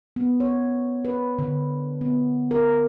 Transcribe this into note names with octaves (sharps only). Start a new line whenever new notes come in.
B3
C#5
B4
D3
B3
A#4